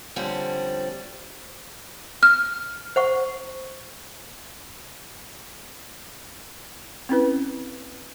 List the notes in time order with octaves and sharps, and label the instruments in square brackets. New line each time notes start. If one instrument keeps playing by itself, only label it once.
[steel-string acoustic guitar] D3 F3 G3 C4 C#4
[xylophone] F6
[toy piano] C5 F#5 C#6
[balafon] C4 C#4 E4 B4